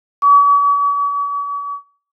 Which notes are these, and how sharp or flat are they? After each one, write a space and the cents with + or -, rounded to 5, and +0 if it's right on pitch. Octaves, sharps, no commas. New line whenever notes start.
C#6 +45